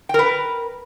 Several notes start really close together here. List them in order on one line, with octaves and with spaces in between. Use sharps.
G5 A#4 B4